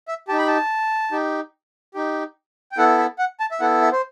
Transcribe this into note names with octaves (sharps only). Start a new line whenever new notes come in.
E5
D#4 G4 A5
B5
A5
D#4 G4
D#4 G4
G5
B3 E4 A4 F#5
E5
F#5
A5
E5
B3 E4 A4 F#5
E5
C5